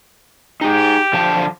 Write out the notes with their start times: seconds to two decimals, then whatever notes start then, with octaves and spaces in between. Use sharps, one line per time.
0.61 D#4 G4 G#4
1.13 D3 F3 A5